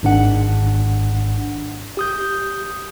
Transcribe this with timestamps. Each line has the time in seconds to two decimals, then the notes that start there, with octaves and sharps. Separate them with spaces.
0.03 G#1 G#2 D4 F#5
1.97 G4 D#6 G6